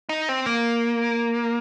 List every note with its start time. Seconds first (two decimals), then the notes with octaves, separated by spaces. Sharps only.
0.09 D#4
0.29 C4
0.46 A#3